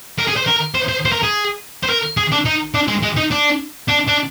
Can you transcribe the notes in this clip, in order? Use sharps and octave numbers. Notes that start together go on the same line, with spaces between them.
A#4
G#4
C5
A#4
C5
C5
C5
A#4
G#4
C5
A#4
G#4
D4
D#4
D4
G#3
G#3
D#4
D4
D4
D4